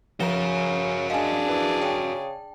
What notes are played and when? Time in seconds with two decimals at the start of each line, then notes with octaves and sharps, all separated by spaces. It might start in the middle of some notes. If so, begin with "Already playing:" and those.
0.20 C#3 F3 F#4 A#4 E7 G7
1.10 G#3 D4 G#4 F5 G#5
1.48 E3
1.82 C#3 G5